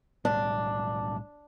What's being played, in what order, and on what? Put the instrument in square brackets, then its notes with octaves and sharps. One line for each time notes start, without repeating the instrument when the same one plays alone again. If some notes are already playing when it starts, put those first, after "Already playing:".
[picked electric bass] B1 A2 G3 [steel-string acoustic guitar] D4